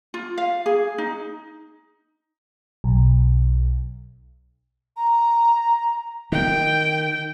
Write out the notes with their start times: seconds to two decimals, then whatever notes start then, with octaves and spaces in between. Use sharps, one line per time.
0.14 F4
0.38 F5
0.66 G#4
0.98 D#4
2.84 B1
4.97 A#5
6.32 D#3 G5